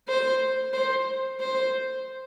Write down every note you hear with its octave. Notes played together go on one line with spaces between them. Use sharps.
C5
C5
C5